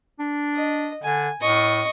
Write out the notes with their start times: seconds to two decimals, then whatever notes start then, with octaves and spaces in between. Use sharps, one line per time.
0.19 D4
0.54 D#5
1.03 D3 G#5
1.41 A2 D#5 C#6